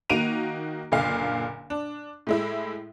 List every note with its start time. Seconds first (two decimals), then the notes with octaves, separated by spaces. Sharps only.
0.09 D#3 A#3 F#4 D7 D#7 F7
0.92 F#1 A#2 D3 F5
1.70 D4
2.27 A2 G#3 E4